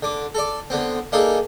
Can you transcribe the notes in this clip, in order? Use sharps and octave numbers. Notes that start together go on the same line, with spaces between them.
D3 D6
A4 D5
D3 B3 C4
A#3 D4 D#4 G#4 A4